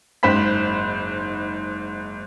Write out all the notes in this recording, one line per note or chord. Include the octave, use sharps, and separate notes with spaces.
F#1 G#2 C5 B5 B6